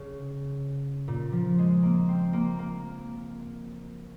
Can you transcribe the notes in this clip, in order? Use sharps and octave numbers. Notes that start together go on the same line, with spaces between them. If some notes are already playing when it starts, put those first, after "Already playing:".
Already playing: C#3
A#2
F3
G#3
A#3
C4
A#3
A#3